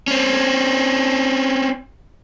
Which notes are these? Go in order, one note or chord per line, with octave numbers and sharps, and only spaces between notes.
C4 C#4